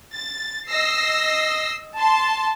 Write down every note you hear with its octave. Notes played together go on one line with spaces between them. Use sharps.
A6
D#5 E6 A#6 C7
A5 C6